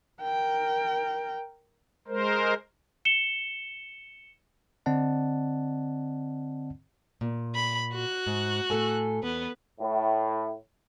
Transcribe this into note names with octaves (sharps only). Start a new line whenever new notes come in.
A#4 G5
G#3 A#4 C5
C#7 E7 G7
D3 C4 D5 D#5 F#5 A5
A#2
B5
F#4 F#6
G#2
A2 A4 G#5
E2 B3 B4
A2